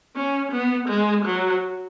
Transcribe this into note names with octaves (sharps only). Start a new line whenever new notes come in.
C#4
B3
G#3
F#3